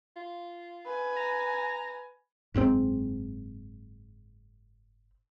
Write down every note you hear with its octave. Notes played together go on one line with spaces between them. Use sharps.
F4
B4 G#5
A#5
F#1 G#2 B2 C4